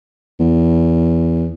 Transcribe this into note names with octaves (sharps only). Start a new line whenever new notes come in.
E2